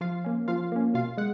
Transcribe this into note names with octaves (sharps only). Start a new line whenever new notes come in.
F3 F4 F5
A#3 C#4
F3 F4 F5
A#3 C#4
B2 F4 F5
G#3 F#5